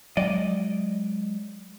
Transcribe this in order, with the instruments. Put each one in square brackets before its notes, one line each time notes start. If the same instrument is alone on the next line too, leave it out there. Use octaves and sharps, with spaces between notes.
[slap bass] F#3 G#3 [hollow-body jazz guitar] D5 D#5